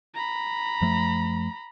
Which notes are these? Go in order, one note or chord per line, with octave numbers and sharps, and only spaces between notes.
A#5 B5
F#2 F3 A3